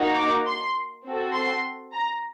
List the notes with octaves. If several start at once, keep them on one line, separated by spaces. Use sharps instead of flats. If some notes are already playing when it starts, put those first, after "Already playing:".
Already playing: A#3 D#4 F#4
D6
C6
C4 F#4 A4
C6
A#5